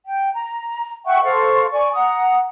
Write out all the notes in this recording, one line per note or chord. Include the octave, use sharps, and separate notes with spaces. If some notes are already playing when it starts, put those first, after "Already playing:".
G5
A#5
E5 F#5 G5 C#6
A4 C5 F5 C#6
D5 G#5 C#6
F#5 A#5 D#6